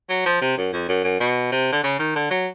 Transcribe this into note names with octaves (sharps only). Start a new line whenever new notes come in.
F#3
F3
C3
F#2
F2
F#2
F#2
B2
C3
D3
C#3
D#3
D3
F#3